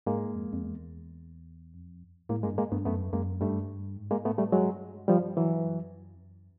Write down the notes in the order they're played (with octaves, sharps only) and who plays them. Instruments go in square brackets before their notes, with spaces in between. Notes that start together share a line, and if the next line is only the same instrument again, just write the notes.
[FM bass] G#2 [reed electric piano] G#3 A#3
[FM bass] F2
F2
E2
F2
[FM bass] A2 [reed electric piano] G#3 A#3
[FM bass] G2 [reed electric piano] G#3 A#3
[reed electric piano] G#3 A#3
[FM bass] G2 [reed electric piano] A3 B3
[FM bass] F#2 [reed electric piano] A3 B3
[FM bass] F#2 [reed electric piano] G#3 A#3
[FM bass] G2 [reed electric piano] G3 A3
[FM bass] G#2
[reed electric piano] G#3 A#3
[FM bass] A2 [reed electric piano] A3 B3
[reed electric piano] G3 A3
[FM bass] G2 [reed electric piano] F#3 G#3
[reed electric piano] F3 G3
E3 F#3
[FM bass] F#2
F2
F#2